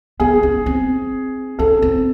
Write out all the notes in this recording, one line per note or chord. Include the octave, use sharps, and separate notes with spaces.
B3 G#4
C#4
C4
C#4 A4
C4